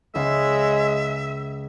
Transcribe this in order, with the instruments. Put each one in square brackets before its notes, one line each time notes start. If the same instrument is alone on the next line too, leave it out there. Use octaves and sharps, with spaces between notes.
[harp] C#2 C#4 F5 [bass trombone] G#3 [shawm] E5